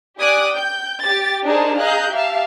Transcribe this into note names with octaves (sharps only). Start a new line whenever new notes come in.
G4 D5 G#5 D6 D#6 F#6
G5 G6
G4 A6
D4 D#4 G#4 A#4 C5 A5
G#4 D#5 F5 A#5 F#6 G6
G4 E5 F5 A5